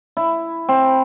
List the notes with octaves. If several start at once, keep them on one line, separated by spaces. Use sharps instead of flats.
E4
C4